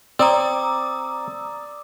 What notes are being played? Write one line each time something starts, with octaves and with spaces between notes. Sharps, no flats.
C4 D5 A#5 D#6 E6